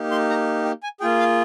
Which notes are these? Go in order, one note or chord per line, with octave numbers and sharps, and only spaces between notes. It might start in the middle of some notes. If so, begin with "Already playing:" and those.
Already playing: A#3 D#4 G4
C6
A#5
G5
G#5
A#3 F4 G#4 G5
F5